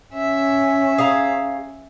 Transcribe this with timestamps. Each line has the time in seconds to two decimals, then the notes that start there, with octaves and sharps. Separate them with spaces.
0.14 C#4 E5
0.98 G#4 F5 A#5